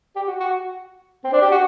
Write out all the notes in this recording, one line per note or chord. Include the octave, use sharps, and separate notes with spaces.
G4
F#4
F#4
C4
D4
G4
F#4